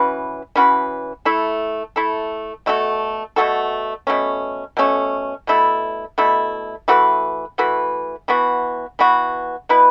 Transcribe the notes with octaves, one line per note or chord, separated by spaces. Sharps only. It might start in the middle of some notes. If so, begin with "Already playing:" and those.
Already playing: E3 C#4 F#4 B4
E3 C#4 F#4 B4
A3 E4 A4
A3 E4 A4
B2 A3 F#4 A4
B2 A3 F#4 A4
B2 A3 C#4
B2 A3 C#4
B2 A3 E4
B2 A3 E4
E3 A3 F#4 B4
E3 A3 F#4 B4
E3 B3 F#4
E3 B3 F#4
B2 B3 E4 B4